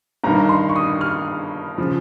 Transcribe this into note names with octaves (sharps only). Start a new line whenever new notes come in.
G1 G2 D#3 A#5
C6
C#6
D#6
F6
C#3 F3